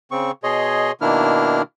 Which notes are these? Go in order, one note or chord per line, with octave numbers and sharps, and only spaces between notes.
C#3 C4 C#6
B2 G#4 C#5 D#5 C6
B2 D#3 A#3 D4 E4 F6